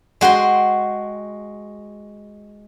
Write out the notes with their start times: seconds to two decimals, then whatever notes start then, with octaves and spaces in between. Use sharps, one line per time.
0.21 G#3 F#4 G5 C6